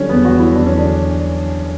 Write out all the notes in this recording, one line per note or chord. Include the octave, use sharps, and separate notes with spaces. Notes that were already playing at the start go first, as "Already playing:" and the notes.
Already playing: D3 F#3 G3 C#4
E2 B3
F#4
F#3
E4
E2 D4
C#4
D3 D4